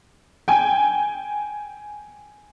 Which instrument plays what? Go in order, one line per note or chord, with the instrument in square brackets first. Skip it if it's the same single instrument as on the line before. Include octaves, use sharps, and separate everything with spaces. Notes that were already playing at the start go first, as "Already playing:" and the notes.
[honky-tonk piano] G5 G#5